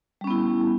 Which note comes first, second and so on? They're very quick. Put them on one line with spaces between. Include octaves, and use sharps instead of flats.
G3 C#4 B3 E4